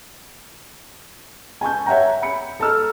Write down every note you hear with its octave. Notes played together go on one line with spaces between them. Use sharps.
G#5 A5 C#6 G6
C#5 E5 F#5 G5 A#5
B5 C#7
A4 A5 A#5 E6 F6